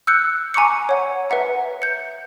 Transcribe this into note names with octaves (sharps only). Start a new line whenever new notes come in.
E6 F#6 G6 C#7
G#5 A#5 C#6 D6 C#7
C#5 F#5
B4 E5 F#5 A#5
G6 C#7